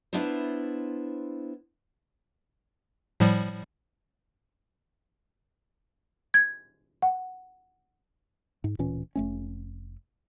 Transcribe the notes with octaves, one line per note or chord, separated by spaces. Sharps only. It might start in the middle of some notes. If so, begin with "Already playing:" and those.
B3 D4 E4 F4 C5
A2 F3 G3
G#6
F#5
G#2
D1 A#2 E3 C#4
F1 A3 C#4